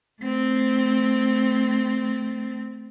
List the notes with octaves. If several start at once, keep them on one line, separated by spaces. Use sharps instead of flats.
A3 C4